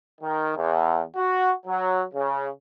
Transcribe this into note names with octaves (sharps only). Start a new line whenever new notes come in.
D#3
E2
F#4
F#3
C#3